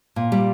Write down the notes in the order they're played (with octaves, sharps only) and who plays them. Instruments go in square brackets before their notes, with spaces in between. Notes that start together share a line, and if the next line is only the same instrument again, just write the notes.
[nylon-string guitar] A#2
G3